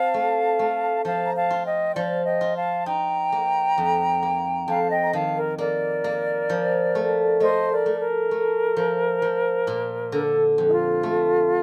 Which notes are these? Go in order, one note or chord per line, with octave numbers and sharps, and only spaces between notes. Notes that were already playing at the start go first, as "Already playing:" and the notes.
Already playing: C4 F5 A5
A3
A3
F3 F5 A5
A#5
F5 A5
F4
D#5 G5
F3 D5 F5
D#5 G5
F4
F5 A5
D#4 G5 A#5
A#3
F2
A#3
F2 F5 A5
D#5 G5
A#5
D#3 F5 A5
A#4
A#3 A#4 D5
A#3
F3
A3
A3 C5 D#5
A#4 D5
A3
A#4
A3
F3
F3
A#2
D3 A4
F2
D#4
F4
A3